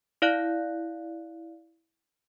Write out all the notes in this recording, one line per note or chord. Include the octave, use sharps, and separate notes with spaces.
E4 D5 F5 F#6